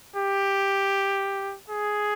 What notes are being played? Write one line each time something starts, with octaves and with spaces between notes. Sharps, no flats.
G4
G#4